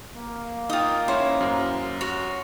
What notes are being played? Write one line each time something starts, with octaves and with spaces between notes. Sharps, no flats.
A#3
D#4 F4 G5 D#6
C#4 E4 C5 C#5
F#2
F#4 C#5